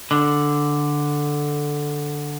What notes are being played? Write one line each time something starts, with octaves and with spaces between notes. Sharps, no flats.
D3